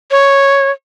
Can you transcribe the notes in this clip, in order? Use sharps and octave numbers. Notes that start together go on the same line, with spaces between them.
C#5